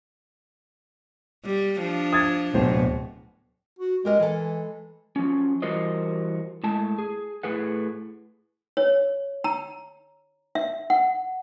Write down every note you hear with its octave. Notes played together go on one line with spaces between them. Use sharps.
G3
F3 D4
D#6 G#6 A6
D1 B2 C5
F#4
G#3 G4 A#4 D#5
E3 G#3 A4
F3 F#3 C#4
E3 G3 F#4 A#4 C5 D#5
A2 G#3 A5
G#4
A2 G#4 B4 F#5
C#5
A#5
E5
F#5